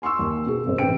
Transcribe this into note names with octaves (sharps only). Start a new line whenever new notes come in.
G#5 C6 C#6 E6
D#2
B2 G#4
G#1 C5
A1 C3 B4 G5 D7